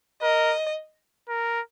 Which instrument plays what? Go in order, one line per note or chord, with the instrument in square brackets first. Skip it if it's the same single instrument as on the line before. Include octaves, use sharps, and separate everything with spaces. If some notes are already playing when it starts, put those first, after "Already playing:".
[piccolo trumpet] A#4 [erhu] D#5
[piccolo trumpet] A#4